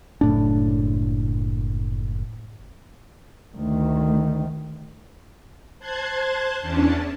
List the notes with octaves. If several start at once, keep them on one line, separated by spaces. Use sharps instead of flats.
F#1 A2 D4
D2 D#3
C5 A5 C6 F#6 G#6
E2 C#4 D4 A5